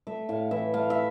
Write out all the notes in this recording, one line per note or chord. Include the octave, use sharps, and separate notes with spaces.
A3 E5
A2 F5
E3 E5
A3 F5
E5